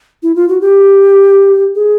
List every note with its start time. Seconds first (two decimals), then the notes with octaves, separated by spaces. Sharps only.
0.23 E4
0.36 F4
0.49 F#4
0.61 G4
1.75 G#4